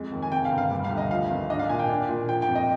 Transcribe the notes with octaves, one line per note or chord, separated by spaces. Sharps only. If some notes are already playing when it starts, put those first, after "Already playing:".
Already playing: F2 G#3
D#2
G#5
C3 G5
F5
G1
F5
G3
F5
D2
D#5
F3 F5
G#1
D4 D#5
F5
A#2 G#5
G5
D4
A#2
F3 G5
G5
F2
D#5